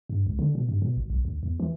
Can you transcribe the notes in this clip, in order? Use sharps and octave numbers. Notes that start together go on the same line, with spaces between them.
G2
C#2
D3
B2
G2
B2
G#1
B1
D2
E2
E3